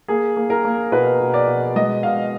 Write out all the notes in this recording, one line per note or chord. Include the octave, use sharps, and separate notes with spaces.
A#3 G#4
A#3
A#4
A#3
B2 B4
B2
D5
B2
G#3 D#5
B2 F5